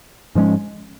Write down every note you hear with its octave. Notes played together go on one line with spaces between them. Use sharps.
G#2 F3 G#3 C#4